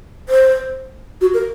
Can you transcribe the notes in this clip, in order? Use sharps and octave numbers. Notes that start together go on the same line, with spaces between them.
C5
F#4
A#4